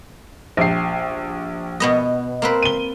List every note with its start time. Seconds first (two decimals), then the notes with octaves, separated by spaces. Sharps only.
0.57 A#1 G4 C7
1.80 B2 B3 D#5
2.42 A#3 C4 B4
2.62 D#7 G7